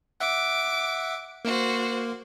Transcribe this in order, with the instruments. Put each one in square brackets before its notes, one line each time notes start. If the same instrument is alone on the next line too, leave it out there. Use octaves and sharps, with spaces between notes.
[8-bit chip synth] E5 F#5 [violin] D6
[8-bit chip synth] A#3 [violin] F#4 C5